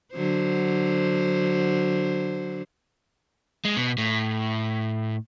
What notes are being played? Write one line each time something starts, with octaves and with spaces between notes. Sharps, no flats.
D3 F#3 C5
G#3
B2
A2